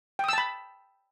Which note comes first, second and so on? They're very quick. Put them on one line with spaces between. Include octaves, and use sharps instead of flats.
G5 D#6 E6 A5 B5